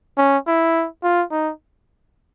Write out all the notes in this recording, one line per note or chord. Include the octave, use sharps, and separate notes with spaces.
C#4
E4
F4
D#4